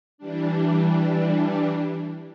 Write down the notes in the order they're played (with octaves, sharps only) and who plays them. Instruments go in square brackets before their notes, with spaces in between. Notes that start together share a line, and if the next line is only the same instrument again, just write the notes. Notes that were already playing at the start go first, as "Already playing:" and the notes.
[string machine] E3 G3 D4